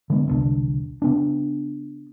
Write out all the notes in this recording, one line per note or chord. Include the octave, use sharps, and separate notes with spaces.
D3 G#3 B3
E1 C2 D3
C#3 B3 D4